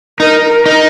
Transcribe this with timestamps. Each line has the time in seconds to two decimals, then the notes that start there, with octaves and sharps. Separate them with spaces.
0.20 D#4 A#4
0.50 A#4
0.66 D#4